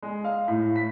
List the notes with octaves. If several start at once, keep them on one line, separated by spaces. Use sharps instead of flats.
G#3
F5
A2
B6